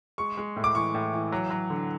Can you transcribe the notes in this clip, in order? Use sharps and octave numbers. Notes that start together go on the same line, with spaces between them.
G#3 C#6
G#3
A2
D6
E3 C#6
A2
E3
F#3
F#3
D3